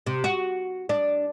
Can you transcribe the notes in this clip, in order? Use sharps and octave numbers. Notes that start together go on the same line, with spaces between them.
C3
F#4
D4